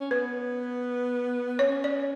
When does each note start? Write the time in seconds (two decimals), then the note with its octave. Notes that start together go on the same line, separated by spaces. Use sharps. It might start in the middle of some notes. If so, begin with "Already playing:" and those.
0.01 C#4
0.11 B3 B4
1.59 C#4 C#5
1.84 D5